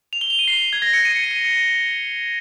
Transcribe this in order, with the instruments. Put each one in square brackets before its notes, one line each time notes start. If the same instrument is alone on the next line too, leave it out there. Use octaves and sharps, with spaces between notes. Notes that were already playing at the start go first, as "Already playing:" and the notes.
[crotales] F7
G7
F7
D#7
C7
G#6
A#6
C#7
D#7
D#7
C#7
D#7